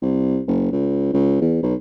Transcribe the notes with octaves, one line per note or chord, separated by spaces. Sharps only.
C2
F#1
C#2
C#2
E2
B1